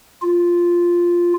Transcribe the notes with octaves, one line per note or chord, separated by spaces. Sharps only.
F4